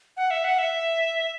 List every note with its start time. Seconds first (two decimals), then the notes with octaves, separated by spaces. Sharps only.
0.17 F#5
0.31 E5
0.44 F#5
0.59 E5